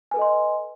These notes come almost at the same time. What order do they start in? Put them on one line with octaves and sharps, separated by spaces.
G#5 B4 A4 D#5 C6